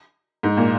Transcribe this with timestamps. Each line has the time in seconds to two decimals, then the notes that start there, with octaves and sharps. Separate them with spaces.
0.43 G#2
0.57 A#2